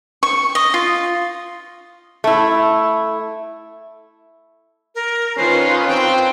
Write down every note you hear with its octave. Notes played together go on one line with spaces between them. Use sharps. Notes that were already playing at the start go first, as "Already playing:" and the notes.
C#6
D#5
F4
A3 E4
A#4
D#3 C#4 F4 B4 C5
C4 G5